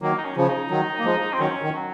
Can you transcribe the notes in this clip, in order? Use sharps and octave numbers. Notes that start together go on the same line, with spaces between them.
D#3 F#3 A#3
D#4
C#4
C#3 F3 C#4
D#4
D#3 F#3
A#3
F3 G#3
C4
D#3 F#3 C#4
D#3
F#3